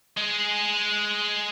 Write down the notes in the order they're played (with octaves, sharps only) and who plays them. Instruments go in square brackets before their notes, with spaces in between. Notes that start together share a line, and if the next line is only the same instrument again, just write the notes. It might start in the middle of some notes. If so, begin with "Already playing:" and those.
[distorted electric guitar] G#3 G#4